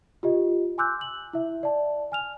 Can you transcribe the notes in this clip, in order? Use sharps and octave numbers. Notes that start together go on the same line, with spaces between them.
F4 G4 D#5
G#5 C6 D6 E6 F#6 G6
F#7
E4 E5
D5 A5
G#5 F6 F7